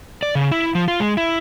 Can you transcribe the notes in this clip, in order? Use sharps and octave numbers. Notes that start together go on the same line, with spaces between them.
D5
C#3
E4
F3
F4
G#3
E4